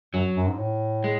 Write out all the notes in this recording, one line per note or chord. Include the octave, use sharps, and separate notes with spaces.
F#2 F#3
F#2
G#2
A2
G#3